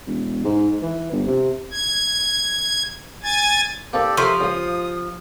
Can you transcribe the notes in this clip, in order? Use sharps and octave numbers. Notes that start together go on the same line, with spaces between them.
E1
G#2
E3
G1
C3
G#6
G#5 G#6 A6
A#3 C4 D#4 G4 A4 D5
F3 G4 A4 A#4 E5 C6 C#6
C#2 C#3 D#6